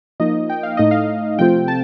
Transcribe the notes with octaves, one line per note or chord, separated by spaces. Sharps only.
F3 A#3 D#4 D#5
G5
F5
A2 A3 D#4 D#5
F5
C3 F3 A3 C4 F4 G5
A5